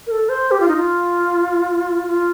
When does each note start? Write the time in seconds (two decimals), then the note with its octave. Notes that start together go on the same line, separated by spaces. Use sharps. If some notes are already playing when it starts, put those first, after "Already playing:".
0.07 A#4
0.11 A4
0.29 C5
0.51 G4
0.60 F4
0.68 D#4
0.76 F4
2.07 F4